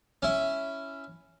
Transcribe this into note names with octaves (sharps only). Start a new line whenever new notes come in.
C#4 E4